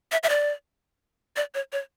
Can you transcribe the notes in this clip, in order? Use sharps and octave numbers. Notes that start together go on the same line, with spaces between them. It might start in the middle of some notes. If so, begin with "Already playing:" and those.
E5
E5
D5
D5
C#5
C#5